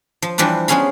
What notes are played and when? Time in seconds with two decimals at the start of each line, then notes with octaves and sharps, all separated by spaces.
0.22 F3
0.38 E3 F3 G3 D4 B4
0.68 G#3 B3 C#4 G#4 F5 B5